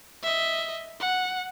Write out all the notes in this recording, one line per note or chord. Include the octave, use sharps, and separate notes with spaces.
D#5 E5
F#5